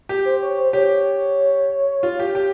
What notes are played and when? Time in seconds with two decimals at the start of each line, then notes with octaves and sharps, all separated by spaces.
0.09 G4
0.25 C5
0.42 C#5
0.58 C5
0.73 G4 C#5
2.03 F4
2.20 G4
2.35 G4